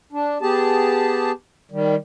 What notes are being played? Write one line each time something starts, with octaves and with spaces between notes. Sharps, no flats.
D4
B3 G4 G#4 A5
D#3 G3